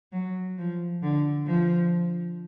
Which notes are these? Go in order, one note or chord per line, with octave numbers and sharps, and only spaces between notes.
F#3
F3
D3
F3